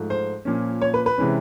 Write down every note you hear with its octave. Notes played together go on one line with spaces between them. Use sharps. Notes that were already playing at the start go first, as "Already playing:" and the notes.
Already playing: G#2 F3 A3
C5
A#2 F3 A#3 C#4
C#5
B4
B4
C3 E3 G#3 C#4